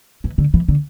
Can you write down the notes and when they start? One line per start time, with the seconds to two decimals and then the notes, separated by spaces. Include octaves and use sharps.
0.24 E3
0.38 D3
0.54 E3
0.69 D3